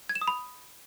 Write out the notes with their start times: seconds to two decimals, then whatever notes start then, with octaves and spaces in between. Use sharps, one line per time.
0.09 G#6
0.15 E7
0.21 D#6
0.28 B5